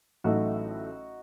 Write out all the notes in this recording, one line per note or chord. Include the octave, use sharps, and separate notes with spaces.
A1 A2 F#3 A3 D#4 F#4